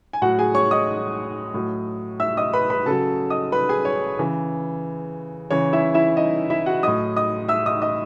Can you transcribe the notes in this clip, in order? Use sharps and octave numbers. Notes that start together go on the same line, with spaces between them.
G#5
A2 F#3 F#4 F#5
G#4 G#5
C#5 C#6
D#5 D#6
A2 F#3
E5 E6
D#5 D#6
B4 B5
B4 B5
C#3 F#3 A4 A5
D#5 D#6
B4 B5
G#4 G#5
C#5
C#3 E3
C#3 E3 C#5
E4 E5
E4 E5
D#4 D#5
E4 E5
F#4 F#5
A2 F#3 D#5 D#6
D#5 D#6
E5 E6
D#5 D#6
D#5 D#6